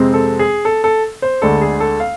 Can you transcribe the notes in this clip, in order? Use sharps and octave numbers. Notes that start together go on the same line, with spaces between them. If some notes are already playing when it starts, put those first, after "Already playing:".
Already playing: F2 C3 G#3 C4
A4
G#4
A4
A4
C5
D2 D3 G#3 D4 A4
G#4
A4
F5